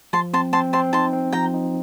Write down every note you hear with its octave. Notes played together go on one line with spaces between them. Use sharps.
F3 A5 C6
C4 A5 C6
C4 A5 C6
C4 A5 C6
D#4 A5 C6
C4
F3 G5 A#5
D#4